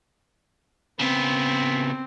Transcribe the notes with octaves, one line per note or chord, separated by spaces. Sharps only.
C#3 B3 C4